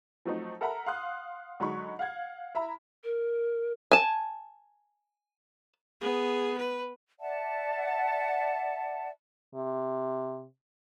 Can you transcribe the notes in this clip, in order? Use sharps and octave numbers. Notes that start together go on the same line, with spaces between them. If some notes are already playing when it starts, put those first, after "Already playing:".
F3 F#3 A3 C4 D#4
A4 A#4 E5 F#5 A#5 B5
F5 F#5 C6 D#6 F#6
D3 F#3 G#3 D#4 B5 C#6
F5 F#5 G#6
E4 E5 A#5 B5
A#4
G#5 A5
B3 G#4
B4
D5 E5 F#5 A5
C3